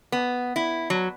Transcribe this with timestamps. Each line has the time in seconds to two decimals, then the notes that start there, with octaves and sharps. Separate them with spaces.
0.12 B3
0.56 E4
0.90 F#3